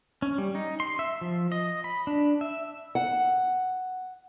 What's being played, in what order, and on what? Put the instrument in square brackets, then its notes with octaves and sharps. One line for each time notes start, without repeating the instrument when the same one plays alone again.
[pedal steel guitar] C#4
G3
D#4
C6
E5
F3
D#5
B5
D4
E5
[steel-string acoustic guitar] F#5